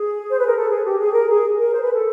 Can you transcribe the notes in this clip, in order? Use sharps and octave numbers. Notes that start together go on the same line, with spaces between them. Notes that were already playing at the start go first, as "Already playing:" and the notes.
Already playing: G#4
C5
B4
A#4
A4
G#4
G4
G#4
A#4
G#4
A#4
C5
B4
A4